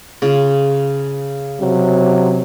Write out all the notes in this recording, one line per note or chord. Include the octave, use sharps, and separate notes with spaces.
C#3 F4 G#4
C3 F#3